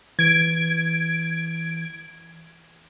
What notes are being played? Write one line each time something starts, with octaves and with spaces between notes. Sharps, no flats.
E3 G#6 D7